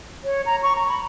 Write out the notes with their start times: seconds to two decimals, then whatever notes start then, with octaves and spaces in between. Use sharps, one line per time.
0.24 C#5
0.46 A#5
0.63 C#6
0.76 A#5
0.88 B5